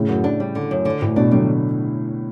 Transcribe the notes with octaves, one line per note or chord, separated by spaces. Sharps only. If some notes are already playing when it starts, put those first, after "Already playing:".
Already playing: A2 C#3
F#2
D4
G3
D3
F#2
D3
D2 A2
B2 D4
D3 F#3 G3